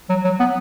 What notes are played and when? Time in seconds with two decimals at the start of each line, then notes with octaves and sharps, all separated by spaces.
0.09 F#3
0.24 F#3
0.40 B3